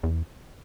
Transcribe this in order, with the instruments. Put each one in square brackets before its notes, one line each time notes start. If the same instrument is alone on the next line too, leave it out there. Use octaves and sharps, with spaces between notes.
[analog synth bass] E2